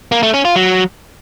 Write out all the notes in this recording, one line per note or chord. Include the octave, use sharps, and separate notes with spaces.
A#3
A3
C#4
F4
F#3